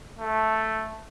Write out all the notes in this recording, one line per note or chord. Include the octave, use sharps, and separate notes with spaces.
A3